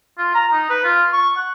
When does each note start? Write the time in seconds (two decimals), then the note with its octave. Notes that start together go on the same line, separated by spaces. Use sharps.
0.18 F4
0.34 A#5
0.52 D#4
0.70 B4
0.84 F4
1.13 C#6
1.37 F#5